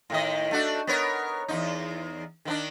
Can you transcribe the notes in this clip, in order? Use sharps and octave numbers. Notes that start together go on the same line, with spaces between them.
A2 D#3 D#5
A3 D4 F#4
B3 A#4 C#5
E2 B2 D#4
D#3 B3 D4